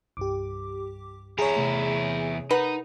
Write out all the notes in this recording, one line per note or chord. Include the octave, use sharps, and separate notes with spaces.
C2 G2 G4 D6
E2 E4 G#4 C#5 A#5
C3 A3
D#4 G#4 A#4 B4 F#5